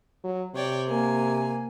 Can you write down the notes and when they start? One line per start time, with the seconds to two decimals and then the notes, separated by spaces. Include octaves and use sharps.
0.24 F#3
0.55 C3 C#5 D5 G5
0.88 A#3 G#5